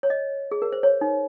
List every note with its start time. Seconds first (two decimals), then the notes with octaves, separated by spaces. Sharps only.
0.03 C#5
0.10 D#5
0.51 G#4
0.62 A#4
0.72 C5
0.83 C#5
1.01 D#4